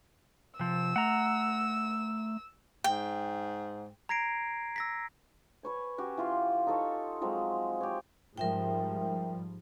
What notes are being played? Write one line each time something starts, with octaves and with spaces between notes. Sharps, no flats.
C3 F3 E6
A3 F#5 A#5
G#2 G5
A#5 G#6 A#6 C7 D7
E6 A#6 B6
B4 C#5 G#5
C#4 F#4 G4
E3 F4 C6
D#4 A4 C#5
F3 F#3 G#3 C4
G4 C#5
G#2 F3 G3 A#4 E5 G5